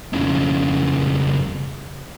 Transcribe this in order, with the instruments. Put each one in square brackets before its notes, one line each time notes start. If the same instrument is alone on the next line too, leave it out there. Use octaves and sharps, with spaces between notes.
[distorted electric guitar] F2 C#3